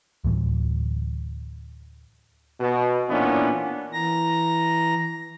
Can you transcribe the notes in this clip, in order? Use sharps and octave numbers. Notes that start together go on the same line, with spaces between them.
D2 A2 E3 F#3
B2
A#2 E3 B3 C#4 D4
E3 A#5 A#6